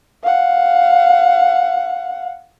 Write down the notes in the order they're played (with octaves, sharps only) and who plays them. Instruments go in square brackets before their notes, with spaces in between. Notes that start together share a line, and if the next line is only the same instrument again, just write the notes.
[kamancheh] F5 F#5